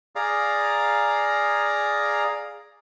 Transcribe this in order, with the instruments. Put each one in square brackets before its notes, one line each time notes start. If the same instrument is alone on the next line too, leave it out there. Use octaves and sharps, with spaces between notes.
[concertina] G#4 D5 F5 A#5